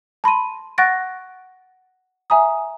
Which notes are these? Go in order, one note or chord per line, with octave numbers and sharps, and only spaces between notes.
A5 B5 C6 D#7
F#5 C#6 F#6 A6 A#6 D7
E5 G#5 A#5 D#6